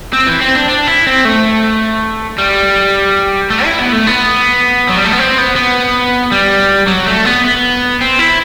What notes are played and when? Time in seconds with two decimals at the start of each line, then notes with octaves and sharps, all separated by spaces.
0.13 C4
0.26 E3
0.41 C4
0.55 D4
0.69 D4
0.88 E4
1.07 C4
1.25 A3
2.38 G3
3.50 A3
3.64 E4
3.79 B3
3.92 A3
4.07 B3
4.89 F#3
4.96 G3
5.04 A3
5.11 B3
5.19 C4
5.38 B3
5.56 B3
6.32 G3
6.88 F#3
7.07 A3
7.25 B3
7.44 B3
8.01 C4
8.19 E4